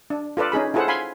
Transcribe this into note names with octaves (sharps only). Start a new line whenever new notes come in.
D4
F4 A4 B4 D5
C#4 D#4 G#4 B5
E4 F4 G#4 A4 C5 F#5
F5 G#5 B5 C6